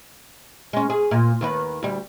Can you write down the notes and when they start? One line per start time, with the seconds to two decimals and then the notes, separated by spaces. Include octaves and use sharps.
0.73 G#3 C#4
0.90 G#4
1.11 A#2
1.41 D#2 D#3 B4
1.83 D2 G3